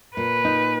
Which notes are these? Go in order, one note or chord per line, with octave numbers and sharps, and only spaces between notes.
A#2 B4
D#4